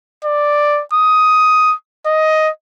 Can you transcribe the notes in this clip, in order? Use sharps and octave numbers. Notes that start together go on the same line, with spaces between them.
D5
D#6
D#5